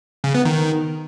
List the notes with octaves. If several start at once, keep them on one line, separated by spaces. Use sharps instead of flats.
C#3
B3
D#3